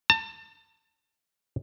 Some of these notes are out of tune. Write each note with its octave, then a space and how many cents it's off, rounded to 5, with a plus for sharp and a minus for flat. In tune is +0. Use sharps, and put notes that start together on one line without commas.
A5 +30